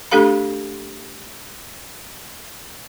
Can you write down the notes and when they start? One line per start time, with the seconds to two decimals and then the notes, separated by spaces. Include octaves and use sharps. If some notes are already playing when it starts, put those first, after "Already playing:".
0.11 A3 D4 G4 A4 F5 B5